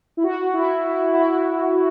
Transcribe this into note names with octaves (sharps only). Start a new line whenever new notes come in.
E4
F#4
E4
E4
E4